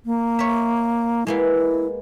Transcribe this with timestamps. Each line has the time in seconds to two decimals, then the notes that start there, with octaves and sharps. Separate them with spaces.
0.06 A#3
0.39 C#5 E5
1.27 G#3 A#3 B3 E4